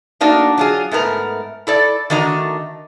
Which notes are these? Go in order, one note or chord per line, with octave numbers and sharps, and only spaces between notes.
A3 A#3 D4 D#4 F#4
F#3 F4 G#4
G#2 A3 B3 A#4 A#5
E4 A4 D5
D#3 A3 D4 F#4 D#5 A#5